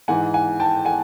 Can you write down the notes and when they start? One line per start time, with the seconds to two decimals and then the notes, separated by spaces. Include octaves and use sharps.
0.08 G#2 E3 F#5 G#5
0.34 F#5 G#5
0.60 G5 A5
0.85 F#5 G#5